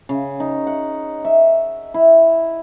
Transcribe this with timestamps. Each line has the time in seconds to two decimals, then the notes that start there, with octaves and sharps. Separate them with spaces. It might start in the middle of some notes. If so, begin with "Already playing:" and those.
0.09 C#3
0.40 D#4
0.67 F#5
1.25 E5
1.94 E4